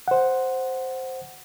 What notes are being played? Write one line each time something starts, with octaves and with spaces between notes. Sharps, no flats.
C5 F#5